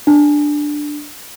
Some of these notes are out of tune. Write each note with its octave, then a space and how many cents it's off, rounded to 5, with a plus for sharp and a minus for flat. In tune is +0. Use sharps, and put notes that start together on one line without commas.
D4 +5